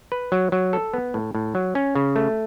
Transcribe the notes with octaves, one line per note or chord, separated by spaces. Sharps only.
B4
F#3
F#3
A4
B3
A2
A2
F#3
C#4
C#3
A3